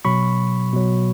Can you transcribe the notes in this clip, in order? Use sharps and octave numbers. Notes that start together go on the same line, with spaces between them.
B2 F#3 B5 C#6
B2 F#3